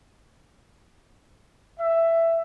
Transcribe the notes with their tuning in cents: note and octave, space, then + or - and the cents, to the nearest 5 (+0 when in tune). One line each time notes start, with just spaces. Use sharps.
E5 +10